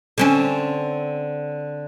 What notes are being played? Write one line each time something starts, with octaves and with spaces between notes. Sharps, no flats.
D3 C4 C#4